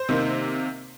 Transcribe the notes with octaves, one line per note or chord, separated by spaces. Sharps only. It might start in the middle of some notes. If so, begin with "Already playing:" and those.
Already playing: C5
C3 D#3 A#3